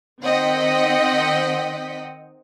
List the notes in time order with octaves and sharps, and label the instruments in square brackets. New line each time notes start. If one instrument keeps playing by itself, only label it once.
[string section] D#3 C4 D#5 F#5 G5 B6